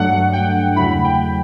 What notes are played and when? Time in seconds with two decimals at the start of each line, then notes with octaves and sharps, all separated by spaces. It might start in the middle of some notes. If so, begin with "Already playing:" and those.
Already playing: G2 F#3 A3 D4 F#5
0.33 G5
0.75 E2 C#3 F#3 A3 E4 B5
1.04 G5